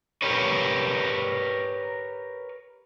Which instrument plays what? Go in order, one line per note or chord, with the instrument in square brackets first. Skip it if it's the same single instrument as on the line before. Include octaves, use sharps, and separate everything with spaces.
[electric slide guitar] G4 A#4 B4 C#5